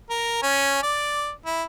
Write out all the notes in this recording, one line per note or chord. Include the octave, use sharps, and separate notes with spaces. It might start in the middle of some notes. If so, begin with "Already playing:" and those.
A#4
C#4
D5
E4